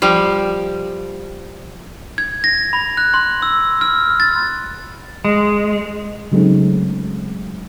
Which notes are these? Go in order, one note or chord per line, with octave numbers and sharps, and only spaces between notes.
F3 G3 G5
G#6
A#6
B5
F#6
C6
E6
F6
A6
G#3
C#3 F#3 G#3 A3 C4 D#4